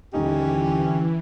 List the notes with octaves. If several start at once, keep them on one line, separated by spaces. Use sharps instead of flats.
D#1 D3 E3 C#4 D#4 G4